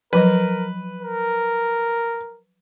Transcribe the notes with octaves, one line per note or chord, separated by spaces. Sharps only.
F3 F#3 A#4 B4 D#5
A#4